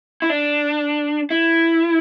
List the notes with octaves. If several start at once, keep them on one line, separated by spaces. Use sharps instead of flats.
E4
D4
E4